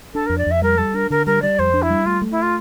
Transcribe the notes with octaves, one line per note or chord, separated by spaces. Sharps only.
D4 A4
F2 A#4
D5
F2 E5
G3 A#4
G3 A4
D4 A#4
D3 A#4
G3 A#4
G3 D5
F2 C5
D4
E4
G3
A3 F4
A3
E4
F4